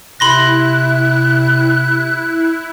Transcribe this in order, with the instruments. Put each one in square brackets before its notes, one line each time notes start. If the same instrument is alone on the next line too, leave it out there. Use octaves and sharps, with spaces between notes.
[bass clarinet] C3 [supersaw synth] E4 [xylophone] B5 C6 A#6 [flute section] F#6